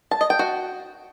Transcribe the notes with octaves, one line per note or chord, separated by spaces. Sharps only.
A5
D#5
G5
F#4